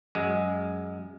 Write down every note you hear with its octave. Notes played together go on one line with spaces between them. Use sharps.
F#2 G#3